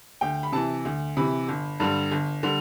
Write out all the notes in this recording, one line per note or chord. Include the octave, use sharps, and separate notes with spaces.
D2 G5
B5
C3 E3 A5
D2
C3 E3 B5
G1
G2 D3 G3
G1
D3 G3